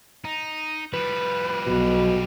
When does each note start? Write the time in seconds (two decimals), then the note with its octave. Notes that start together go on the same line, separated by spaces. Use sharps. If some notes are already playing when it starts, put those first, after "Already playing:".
0.25 D#4
0.93 F3 G3 B4
1.67 B1 B2